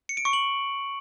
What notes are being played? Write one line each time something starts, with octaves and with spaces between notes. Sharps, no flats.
C#7
D7
C#6
F#7